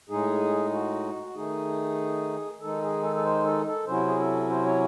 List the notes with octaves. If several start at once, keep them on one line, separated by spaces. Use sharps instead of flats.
A2 G#3 D#4 G#4
F#4
F#4
D#3 A3 D#4 G#4
D#3 G#3 D#4 A4
G#4
A4
A4
C5
A4
A4
C3 F#3 C#4 E4 C5
G#4
A4
C5
C#5